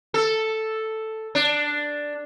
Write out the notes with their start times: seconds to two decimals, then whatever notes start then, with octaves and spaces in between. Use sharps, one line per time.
0.14 A4
1.35 D4